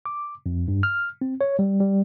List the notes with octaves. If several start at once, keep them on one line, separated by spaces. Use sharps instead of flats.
D6
F2
G2
F6
C4
C#5
G3
G3